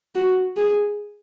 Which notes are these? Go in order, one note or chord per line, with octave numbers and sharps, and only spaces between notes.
F#4
G#4